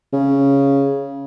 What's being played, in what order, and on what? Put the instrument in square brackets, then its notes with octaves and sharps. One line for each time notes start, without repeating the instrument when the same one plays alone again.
[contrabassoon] C#3